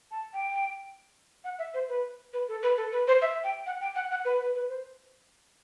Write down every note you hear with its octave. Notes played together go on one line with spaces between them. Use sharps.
A5
G5
F#5
E5
C5
B4
B4
A4
B4
A4
B4
C5
E5
G5
F#5
G5
F#5
F#5
B4
B4
B4
C5